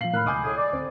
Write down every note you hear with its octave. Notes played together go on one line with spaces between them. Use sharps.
A#2 F3 F5 C7 F#7
A2 D#3 A#4 B5 F6 F#6
C#2 B2 D#5 G#5 D6 D#6 G6
A2 G#4
D5
D2 C4